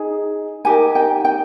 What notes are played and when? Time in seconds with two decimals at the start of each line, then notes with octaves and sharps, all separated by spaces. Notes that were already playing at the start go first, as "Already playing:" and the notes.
Already playing: D#4 G#4
0.65 D#4 G4 A#4 G#5
0.95 G5
1.25 G5